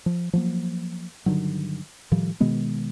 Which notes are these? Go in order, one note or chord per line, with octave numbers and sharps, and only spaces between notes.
F3
F3 F#3 A#3
G2 D3 D#3 F#3
A2 D#3 F3 G3
B2 D#3 G#3 B3